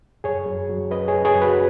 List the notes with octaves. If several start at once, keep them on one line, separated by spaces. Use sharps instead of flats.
F#2 G#4 C#5
F#2
F#3
C#4 B4 D#5
G#4 C#5
F#2
G#4 C#5
F#2
F#4 B4